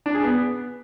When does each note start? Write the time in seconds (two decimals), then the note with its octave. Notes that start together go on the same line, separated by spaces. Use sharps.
0.06 D4
0.15 G#4
0.23 B3